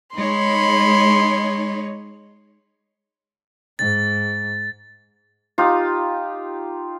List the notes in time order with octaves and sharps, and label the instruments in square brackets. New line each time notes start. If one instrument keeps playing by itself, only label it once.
[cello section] G#3 D#4 C#5 [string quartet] B5 C6
[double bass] G#2 [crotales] A6
[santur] D#4 F4 G4